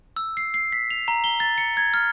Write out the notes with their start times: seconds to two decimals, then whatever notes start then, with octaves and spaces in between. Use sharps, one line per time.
0.16 E6
0.37 C7
0.54 C7
0.72 B6
0.90 F7
1.08 A#5
1.24 G7
1.40 A6
1.58 C#7
1.77 G#6
1.94 F6